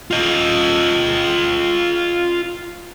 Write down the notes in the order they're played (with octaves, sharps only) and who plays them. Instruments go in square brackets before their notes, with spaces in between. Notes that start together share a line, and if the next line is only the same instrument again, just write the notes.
[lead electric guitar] F4 D#5